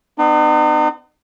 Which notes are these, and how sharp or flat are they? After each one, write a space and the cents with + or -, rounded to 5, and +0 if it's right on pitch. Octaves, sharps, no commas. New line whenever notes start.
B3 +30 D#4 -45